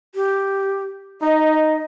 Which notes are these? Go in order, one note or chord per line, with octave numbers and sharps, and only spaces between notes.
G4
D#4 D#5